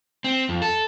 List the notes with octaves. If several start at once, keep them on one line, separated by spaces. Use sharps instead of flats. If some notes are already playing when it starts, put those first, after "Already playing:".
C4
F2
A4